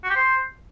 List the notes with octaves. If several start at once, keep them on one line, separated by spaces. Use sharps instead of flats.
F#4
G4
C5